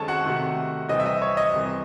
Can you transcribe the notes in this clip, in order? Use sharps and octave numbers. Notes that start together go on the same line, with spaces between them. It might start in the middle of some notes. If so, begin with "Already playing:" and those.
Already playing: F#2 D#3 G#3 C4 A4 C#5 A5 C#6
F#4 F#5
C3 D#3 A3
C2 C3 E3 C4 D#5
E5
D#5
C#5
D#5
C2 C3 E3